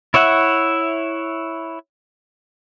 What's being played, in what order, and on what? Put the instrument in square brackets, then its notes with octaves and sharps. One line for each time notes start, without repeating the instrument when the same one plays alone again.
[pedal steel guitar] E4 C#5 E5 F#5